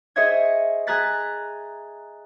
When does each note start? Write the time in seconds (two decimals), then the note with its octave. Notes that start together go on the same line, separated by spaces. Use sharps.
0.16 G#4 C5 C#5 D#5 E5 G#6
0.87 G#4 G#5 A#5 F#6 A6 B6